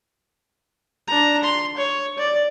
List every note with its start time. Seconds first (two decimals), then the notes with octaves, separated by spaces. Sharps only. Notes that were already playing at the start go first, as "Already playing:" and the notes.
1.08 D4 A#5
1.44 C6
1.77 C#5
2.18 D5